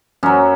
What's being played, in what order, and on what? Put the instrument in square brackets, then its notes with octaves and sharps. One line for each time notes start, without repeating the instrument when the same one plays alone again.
[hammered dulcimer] F#2 F#3 C#4